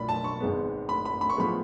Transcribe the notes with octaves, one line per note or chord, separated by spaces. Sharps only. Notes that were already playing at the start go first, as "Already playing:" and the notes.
Already playing: B1 A2 F3 D5 B5
A5
C#6
G#1 G#2 G#3 B3
B5
B5
B5
C#6
A2 F3 G#3 B3 B5